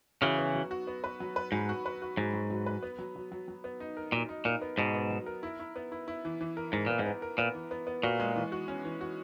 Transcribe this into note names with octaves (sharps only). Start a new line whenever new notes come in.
C#3 E3 F#4
B3
F#3
F#4
B3
B4
F#3
B4
G#2 F#3
F#4
B4
F#4
G#2 F#3
F#3
F#3
B4
B3
F#3
F#3
F#3
F#3
B3
D#4
A#4
A#2 F#3
D#4
A#2 A#4
B3
G#2 B2 B3
B3
F#3
A#4
E4
E4
B3
E4
E4
E3
E3
A#4
G#2 A#4
A#2 B3
G#2
B3
A#4
A#2 B3
E3
B3
B3
A#2 F#4
G#3
E3
F#4
C#4
E3
F#4